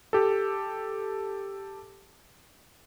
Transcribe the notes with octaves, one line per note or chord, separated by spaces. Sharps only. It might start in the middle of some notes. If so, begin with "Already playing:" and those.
G4 A4